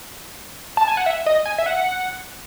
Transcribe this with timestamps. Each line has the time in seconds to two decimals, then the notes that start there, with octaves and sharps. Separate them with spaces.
0.77 A5
0.88 G#5
0.97 F#5
1.06 E5
1.26 D#5
1.45 G#5
1.58 E5
1.66 F#5